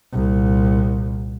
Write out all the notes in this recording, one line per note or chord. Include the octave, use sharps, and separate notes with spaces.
C2 A#2